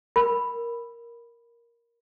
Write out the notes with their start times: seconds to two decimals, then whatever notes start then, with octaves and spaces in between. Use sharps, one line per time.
0.16 A#4 B5